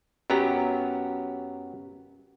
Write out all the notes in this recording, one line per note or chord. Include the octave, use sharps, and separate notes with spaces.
F#2 F#3 B3 G4 A#5